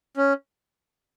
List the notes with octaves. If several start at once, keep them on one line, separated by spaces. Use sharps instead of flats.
C#4